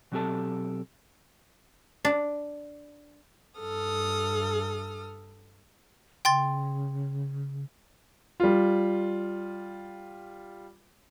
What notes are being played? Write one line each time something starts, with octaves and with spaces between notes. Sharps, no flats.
B2 F#3 C4 G4 A4 A5
D4
G2 A4 D#6 F6
C#3 G5 C6 A6
G3 F4